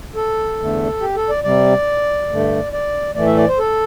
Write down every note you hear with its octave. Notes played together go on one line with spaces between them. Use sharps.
A4
E2 D3 A3
G4
A4
D5
C3 G3 D5
G2 D3 A3
D5
A2 E3 A3 D5
E5
D5
C5
A4